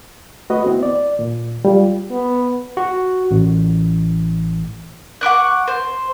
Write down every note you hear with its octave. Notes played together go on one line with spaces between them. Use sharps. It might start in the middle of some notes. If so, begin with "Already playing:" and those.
A3 F#4 B4 D#5
B3 C4 E4
D5
A#2
G3 F4
B3
F#4
A1
F#5 C#6 D6 F#6
C5